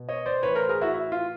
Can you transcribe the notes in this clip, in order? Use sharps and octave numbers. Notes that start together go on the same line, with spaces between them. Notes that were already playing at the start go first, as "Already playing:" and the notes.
Already playing: B2
C#5 D#5
C5 D5
A2 E3 B4 C#5
A#4 C5
G#4 A#4
E4 F#4
E4
F4